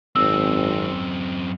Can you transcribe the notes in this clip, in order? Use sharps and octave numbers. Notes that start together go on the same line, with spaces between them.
G#1 F#2 C4 E6